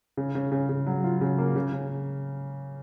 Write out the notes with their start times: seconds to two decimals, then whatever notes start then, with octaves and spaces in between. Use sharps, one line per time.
0.17 C#3
0.35 C#3
0.52 C#3
0.69 C#3
0.86 F#3
1.04 F4
1.21 C#3
1.38 A#3
1.56 C#3
1.73 C#3